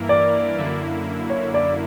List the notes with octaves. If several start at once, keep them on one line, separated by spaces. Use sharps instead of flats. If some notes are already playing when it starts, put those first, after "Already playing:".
Already playing: G2 E3 A#3 E4 A#4
D5
F#2 D3 A#3 E4
C#5
D5